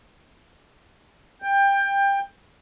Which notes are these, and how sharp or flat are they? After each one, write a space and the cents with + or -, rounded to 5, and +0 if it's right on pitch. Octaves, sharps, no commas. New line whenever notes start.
G5 +20